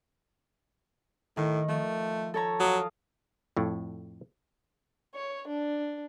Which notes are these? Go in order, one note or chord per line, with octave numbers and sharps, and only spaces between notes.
A2 D#3
F3 A3
A4 C#5 A#5
F#3 F5 D6 D#6
F2 A2
C#5
D4